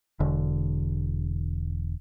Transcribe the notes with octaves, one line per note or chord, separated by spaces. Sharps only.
E1 D3